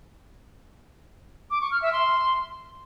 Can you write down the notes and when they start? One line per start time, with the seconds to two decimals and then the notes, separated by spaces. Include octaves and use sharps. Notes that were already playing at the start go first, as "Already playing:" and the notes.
1.50 D6
1.61 C#6
1.71 F6
1.82 E5
1.92 C6